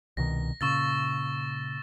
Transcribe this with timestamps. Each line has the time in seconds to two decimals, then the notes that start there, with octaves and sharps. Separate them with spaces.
0.17 C2 B2 D#3 A#6
0.61 A#2 C#3 C#6 E6 A6